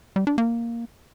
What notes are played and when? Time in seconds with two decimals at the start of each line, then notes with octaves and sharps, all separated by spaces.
0.16 G3
0.27 D4
0.38 A#3